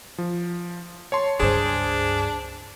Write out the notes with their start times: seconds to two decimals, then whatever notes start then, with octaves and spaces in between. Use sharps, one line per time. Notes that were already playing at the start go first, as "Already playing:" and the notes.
0.18 F3
1.12 C#5 A5 C6
1.40 C#2 G2 D4 G#4 C5